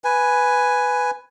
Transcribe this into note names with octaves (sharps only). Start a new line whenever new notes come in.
B4 G#5